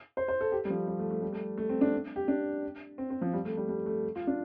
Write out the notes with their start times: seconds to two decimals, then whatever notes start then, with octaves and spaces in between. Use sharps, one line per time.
0.17 C5
0.28 C5
0.41 A4
0.52 G4
0.65 G3
0.70 F3
0.87 G3
0.99 A3
1.11 A3
1.22 G3
1.33 A3
1.58 A3
1.69 C4
1.81 D4
2.16 G4
2.28 D4
2.98 C4
3.10 C4
3.22 F3
3.33 G3
3.45 A3
3.57 G3
3.69 G3
3.86 A3
4.16 F4
4.27 D4